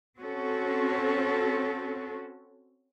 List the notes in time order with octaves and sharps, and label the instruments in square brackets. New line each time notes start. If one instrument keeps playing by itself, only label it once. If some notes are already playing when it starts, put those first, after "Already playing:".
[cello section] C4 C#4 F#4 A4